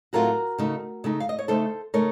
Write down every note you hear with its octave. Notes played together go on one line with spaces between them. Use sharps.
A2 F#3 A3 C4 F4 F#4 A#4
C#3 A3 D#4
C#3 A3 D#4
F5
D#5
C#5
C#3 A3 D#4 A4 C5
C#3 A3 D#4 A#4 C#5